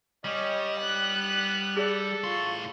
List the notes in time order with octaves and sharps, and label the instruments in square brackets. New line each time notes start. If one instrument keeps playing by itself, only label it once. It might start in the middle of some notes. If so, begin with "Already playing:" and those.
[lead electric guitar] G3 G4 [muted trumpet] C#4 [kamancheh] C#5 D#5
[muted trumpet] B3 [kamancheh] F#6
[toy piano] G#4 D5 [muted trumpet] A4
[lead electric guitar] A2 C6 [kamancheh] F4 C#6